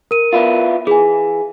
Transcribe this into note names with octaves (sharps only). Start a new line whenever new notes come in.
A#4 D#7
B3 E4 F4
E3 G#4 G#5